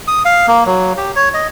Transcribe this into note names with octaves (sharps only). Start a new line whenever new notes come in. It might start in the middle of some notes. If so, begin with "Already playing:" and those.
D#6
F5
A#3
F#3
G4
C#5
D#5